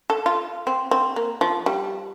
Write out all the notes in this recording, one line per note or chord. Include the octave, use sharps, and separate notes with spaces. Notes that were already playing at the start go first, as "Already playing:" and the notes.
A4
F4
C4
C4
A#3
F3
G3